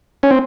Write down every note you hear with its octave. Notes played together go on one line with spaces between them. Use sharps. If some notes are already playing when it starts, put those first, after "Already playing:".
C#4
C4